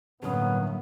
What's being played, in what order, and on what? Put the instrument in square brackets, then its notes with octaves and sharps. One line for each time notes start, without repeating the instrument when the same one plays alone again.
[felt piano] G1 C#4 D#6 [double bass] A2 A#3 [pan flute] F#3 [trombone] B3